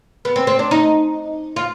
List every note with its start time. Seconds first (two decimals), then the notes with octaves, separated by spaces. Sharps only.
0.25 B3
0.36 C4
0.47 C4
0.59 D4
0.71 D#4
1.56 F4